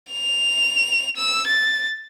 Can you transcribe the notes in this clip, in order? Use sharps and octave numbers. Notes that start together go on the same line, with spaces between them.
F7
E6
A6